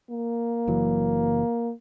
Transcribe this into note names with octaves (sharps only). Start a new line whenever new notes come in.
A#3
F#1 E3 F#3